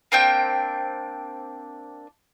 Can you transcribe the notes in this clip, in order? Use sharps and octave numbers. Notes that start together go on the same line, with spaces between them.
A#3 C4 D4 G5